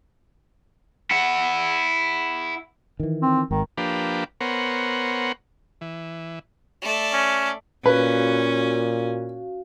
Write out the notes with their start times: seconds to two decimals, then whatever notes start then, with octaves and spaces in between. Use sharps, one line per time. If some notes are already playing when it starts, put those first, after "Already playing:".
1.11 E4 F#5
3.00 D#3 E3
3.22 C4
3.51 G#1 D#3
3.78 F3 A#3 D4 G4 B4
4.41 B3 A#4 C5 C#5 F#5
5.81 E3
6.82 A3 D5
7.13 C#4
7.86 A#2 C#4 F#4 B4 F5